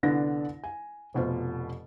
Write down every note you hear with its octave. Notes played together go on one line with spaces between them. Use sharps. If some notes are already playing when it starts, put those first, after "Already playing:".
C2 D3 B3 D4 A#6
G#5
F1 B2 F4 C5